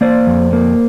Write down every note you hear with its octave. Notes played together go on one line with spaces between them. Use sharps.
A#3 C5 D5
F2
A#3